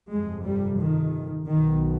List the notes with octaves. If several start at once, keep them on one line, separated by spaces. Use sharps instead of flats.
G1 F2 C3 G#3
G3
D#3
B1 B2 D#3